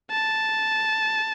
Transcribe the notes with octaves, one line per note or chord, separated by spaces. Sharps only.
A5